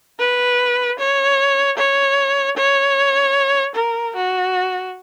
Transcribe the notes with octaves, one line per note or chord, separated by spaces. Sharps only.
B4
C#5
C#5
C#5
A#4
F#4